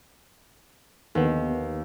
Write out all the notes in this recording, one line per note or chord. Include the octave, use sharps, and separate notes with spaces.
D#2 A#3 B3